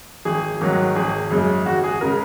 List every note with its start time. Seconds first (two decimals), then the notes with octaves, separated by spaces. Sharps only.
0.25 G#1 G#4
0.61 G#2 D#3 F#3
0.95 G#1 G#4
1.31 F#2 C#3 G#3
1.66 G#1 F#4
1.84 G#4
2.01 C#3 G#3 A#4